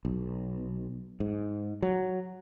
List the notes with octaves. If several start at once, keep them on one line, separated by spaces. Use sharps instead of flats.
B1
G#2
F#3